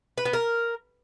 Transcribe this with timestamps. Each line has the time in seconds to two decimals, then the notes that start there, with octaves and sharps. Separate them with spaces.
0.18 B4
0.25 B3
0.33 A#4